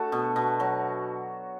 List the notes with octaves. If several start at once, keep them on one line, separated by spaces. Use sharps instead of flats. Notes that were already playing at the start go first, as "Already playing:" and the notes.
Already playing: A3 D4 F#4 A4
B2
B2
F#3